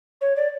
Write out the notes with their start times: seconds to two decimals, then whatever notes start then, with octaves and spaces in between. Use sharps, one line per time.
0.21 C#5
0.36 D5